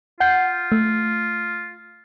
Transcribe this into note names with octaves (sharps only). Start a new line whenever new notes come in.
F4 F#5 G6 C7
A3